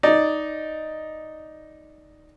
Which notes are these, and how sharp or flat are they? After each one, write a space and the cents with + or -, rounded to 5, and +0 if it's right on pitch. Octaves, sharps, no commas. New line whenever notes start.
D#4 +0 D5 +0